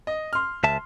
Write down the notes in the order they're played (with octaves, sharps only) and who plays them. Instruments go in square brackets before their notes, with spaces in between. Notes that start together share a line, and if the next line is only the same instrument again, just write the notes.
[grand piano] D#5
C6 F6
[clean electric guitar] C#2 E5 A5